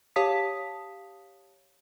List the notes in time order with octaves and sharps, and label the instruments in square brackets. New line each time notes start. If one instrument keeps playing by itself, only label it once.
[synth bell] G4 C#5 F5 A5 D#6 B6